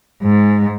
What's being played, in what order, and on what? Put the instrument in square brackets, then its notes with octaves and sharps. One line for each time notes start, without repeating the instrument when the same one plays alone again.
[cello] G#2